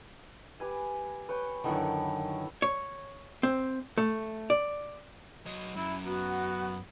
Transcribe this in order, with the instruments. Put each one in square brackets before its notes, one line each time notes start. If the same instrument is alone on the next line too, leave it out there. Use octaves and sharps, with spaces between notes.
[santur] G4 B4 G#5
B4 C#5 G5
[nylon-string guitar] F#2 D3 D#3 [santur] A3 B3 E4
[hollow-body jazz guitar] C#5
C4
A3
D5
[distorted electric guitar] F#3 D#5
[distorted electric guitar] F#2 [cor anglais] E4
[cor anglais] B3 [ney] F#4